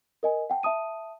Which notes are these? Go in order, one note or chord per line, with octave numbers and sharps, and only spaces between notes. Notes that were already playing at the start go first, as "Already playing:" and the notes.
A#4 D#5 G#5
F#5 G5 A5
E5 A5 D#6 D#7